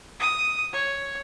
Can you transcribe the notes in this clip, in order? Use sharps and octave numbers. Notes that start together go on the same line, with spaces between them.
D#6
C#5